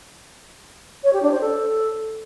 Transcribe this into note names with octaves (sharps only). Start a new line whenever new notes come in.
C#5
G4
D4
C5
A4